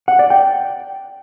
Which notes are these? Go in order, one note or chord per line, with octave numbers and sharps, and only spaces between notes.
F#5
D5
G5